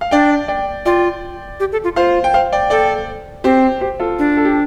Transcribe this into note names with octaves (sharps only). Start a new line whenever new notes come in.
F5
D4 D5 G5
D5 G5
F4 D5 G5
G4
A4
F4
F4 C5 F5
G5
C5 F5
D5 G5
A4 D5 G5
C4 G4 C5
G4 C5
F4 A4
D4
A4
G4